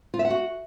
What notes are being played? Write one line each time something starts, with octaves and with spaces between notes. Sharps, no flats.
F4
E5
F#5
F#4